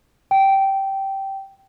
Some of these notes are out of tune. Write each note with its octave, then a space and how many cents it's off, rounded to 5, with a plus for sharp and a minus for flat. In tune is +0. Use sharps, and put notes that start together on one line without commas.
G5 -15